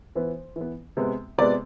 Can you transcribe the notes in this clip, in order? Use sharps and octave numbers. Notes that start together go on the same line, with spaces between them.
E3 B3 C5
E3
B3
C3 G#3 B3
C3 G#3 B3 D5